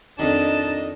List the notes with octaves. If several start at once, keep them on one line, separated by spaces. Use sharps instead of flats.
F2 D#3 D4 D#4 D#5 A5